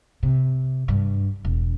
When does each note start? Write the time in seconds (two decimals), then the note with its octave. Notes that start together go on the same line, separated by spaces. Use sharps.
0.23 C3
0.88 G2
1.45 E1